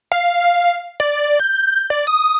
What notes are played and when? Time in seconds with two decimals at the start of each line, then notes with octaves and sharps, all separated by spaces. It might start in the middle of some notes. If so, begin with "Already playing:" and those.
0.12 F5
1.00 D5
1.40 G6
1.90 D5
2.07 D#6